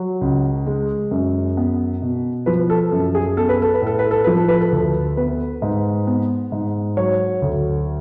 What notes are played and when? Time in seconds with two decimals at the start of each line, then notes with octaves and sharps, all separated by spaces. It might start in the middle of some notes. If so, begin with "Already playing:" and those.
Already playing: F#3
0.21 C#2
0.67 G#3
1.11 F#2
1.57 B3
2.02 B2
2.46 F3 B4
2.70 A4
2.92 F#2 A4
3.15 G#4
3.37 B3 A4
3.49 B4
3.62 A4
3.74 B4
3.81 A2
3.87 A4
3.99 B4
4.11 A4
4.24 F3 B4
4.36 A4
4.48 B4
4.61 A4
4.72 D2
5.17 B3 B4
5.62 G#2
6.07 B3
6.52 G#2
6.97 F#3 C#5
7.42 D2